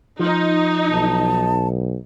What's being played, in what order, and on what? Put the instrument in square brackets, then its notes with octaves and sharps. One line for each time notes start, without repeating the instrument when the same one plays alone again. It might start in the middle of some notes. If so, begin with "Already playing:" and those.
[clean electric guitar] F3 [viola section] D#4
[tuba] B1 [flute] A5